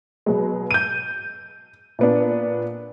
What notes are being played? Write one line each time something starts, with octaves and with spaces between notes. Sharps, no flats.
B2 F#3 G#3
G6 D#7
A#2 B3 D4